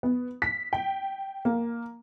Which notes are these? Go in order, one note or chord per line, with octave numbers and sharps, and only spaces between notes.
B3
B6
G5
A#3